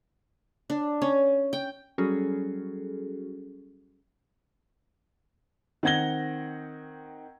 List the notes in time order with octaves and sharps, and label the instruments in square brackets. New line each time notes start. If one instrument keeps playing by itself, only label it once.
[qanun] D4
C#4
G5
[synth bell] F#3 G3 C#4 F#4 G#4 A4
[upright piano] D#3 C4 F#5 G#6 A#6 G7